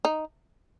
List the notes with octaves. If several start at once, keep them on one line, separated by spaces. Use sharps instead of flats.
D#4